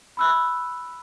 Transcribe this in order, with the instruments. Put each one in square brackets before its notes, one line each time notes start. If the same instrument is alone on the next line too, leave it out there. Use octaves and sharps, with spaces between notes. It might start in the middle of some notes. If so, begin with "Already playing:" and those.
[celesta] B5 E6 F#6